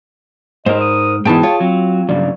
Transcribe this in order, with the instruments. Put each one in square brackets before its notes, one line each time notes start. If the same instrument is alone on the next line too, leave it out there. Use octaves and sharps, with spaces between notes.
[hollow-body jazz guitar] G#2 [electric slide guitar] A#4 C5 [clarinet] D#5
[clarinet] D#6
[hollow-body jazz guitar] G#2 B2 E3 [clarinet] G#4 [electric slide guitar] G5 A5
[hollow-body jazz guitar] F4 C#5
[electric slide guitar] F#3 [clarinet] C4
[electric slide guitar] G2 C#3 F#3 [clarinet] D5